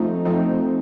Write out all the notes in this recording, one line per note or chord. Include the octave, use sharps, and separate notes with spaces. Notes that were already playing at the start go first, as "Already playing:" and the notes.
Already playing: F3 A3 C4 D#4
F3 A3 C4 D#4